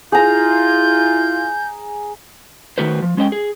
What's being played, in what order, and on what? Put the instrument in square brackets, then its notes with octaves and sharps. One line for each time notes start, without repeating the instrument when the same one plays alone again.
[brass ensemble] E4 F4 [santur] G#4 A#5 [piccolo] G6
[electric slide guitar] D#3 A3 F#4 B4 C5
F3
G#3 C#4 C5 D#5 G5
G#4